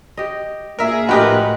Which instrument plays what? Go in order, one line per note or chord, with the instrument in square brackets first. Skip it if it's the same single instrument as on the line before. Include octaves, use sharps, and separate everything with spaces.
[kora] G4 D#5
[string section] A#2 G#4 [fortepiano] A#4 E5
[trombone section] A#1 A#4 B4 [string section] A2 [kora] G#3 [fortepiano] F#4 G4 D#5